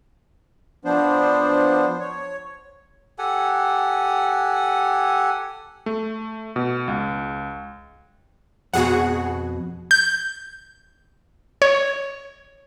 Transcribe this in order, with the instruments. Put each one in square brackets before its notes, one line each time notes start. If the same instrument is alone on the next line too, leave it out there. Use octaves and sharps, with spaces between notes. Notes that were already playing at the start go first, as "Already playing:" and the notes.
[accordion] F3 B3 D4 C5
C#5
[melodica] G4 A4 F#5 G#5
[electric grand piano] A3
B2
C#2
[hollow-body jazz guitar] F2 B2 [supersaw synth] F#4 G#4 F#5
[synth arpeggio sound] G6
C#5